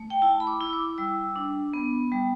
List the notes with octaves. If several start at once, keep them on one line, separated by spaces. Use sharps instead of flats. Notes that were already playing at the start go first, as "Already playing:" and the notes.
Already playing: A3
G5
E4 A5
B5
D6
E4
E6
D6
G3 E6
D4
B3
G3